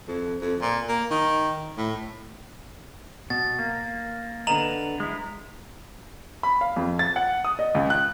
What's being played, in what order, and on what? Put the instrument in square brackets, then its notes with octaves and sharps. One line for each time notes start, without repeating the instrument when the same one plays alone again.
[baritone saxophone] F2
F2
A#2
A#3
D#3
A2
[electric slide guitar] B2 [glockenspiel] A6
[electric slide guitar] A#3
[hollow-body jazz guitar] D3 B3 D#5 [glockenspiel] A#5 F7 F#7
[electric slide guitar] G#3 E4
[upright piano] B5
F5
F2
A6
F#5
D#6
D#5
C#2
F#6